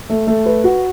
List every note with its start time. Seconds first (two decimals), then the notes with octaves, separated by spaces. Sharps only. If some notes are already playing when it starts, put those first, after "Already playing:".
0.10 A3
0.27 A3
0.46 B4
0.64 F#4